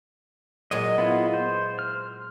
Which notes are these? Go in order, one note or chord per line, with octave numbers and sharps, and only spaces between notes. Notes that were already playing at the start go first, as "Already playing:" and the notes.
A#2 F#3 G#3 D#5
B3 E4 F4
C5
F6